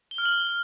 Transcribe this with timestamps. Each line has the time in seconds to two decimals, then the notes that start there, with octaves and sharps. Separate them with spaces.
0.11 G7
0.18 F6
0.25 F#7
0.32 G7